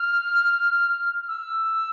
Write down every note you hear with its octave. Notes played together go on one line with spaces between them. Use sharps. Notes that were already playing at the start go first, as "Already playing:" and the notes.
Already playing: F6
E6